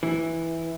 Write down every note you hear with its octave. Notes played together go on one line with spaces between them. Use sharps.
E3